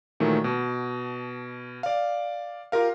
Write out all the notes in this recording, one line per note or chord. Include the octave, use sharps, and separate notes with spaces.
A#2 D#3 E3 F#3 A3
B2
D5 F5
F4 G4 A#4 F5